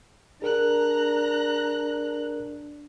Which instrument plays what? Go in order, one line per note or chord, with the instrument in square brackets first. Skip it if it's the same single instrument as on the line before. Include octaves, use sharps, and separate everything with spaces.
[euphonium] D4 [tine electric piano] G#4 A#4 [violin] A#5 F#6